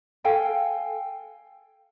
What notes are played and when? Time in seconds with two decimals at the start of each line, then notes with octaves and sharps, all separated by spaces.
0.24 A4 F5 G5 G#5